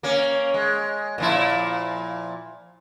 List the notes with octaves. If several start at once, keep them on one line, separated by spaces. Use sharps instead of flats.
A#3 C#4
G#3
A#2 F3 E4